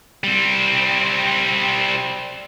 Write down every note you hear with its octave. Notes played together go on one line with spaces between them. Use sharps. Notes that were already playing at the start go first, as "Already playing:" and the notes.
G3 C4